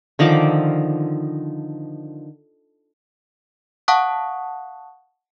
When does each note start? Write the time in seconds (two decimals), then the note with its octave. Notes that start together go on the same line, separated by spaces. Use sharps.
0.19 D3 D#3 F3 D6
3.88 F5 F#5 A5 C#6 D#6 F#6